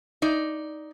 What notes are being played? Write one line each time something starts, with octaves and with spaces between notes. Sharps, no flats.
D#4 D5